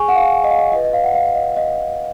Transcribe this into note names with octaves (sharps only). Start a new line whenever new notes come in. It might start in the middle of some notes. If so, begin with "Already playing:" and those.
Already playing: G#4 G#5 C#6
F#5
F5
D#5
F5
D#5
F4 B4 D#5
D#5
F5
F#5
F5
D#5
D#5